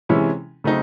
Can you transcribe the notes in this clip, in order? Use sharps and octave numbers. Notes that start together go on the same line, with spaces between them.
C3 E3 G#3 C#4 E4
C#3 F#3 A3 C4 D#4